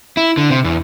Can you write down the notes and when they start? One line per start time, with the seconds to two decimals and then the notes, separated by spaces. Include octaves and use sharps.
0.17 E4
0.37 D3
0.50 C3
0.64 E2